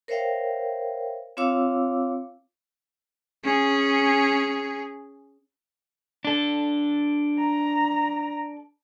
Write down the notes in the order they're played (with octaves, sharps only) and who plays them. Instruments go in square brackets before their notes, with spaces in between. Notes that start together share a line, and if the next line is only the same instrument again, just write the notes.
[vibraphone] A#4 C5 C#5 E5 F5 G5
C4 F4 C#5 F5 D6 E6
[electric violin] C#4 G#4
[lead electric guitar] D4 A4
[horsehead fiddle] A#5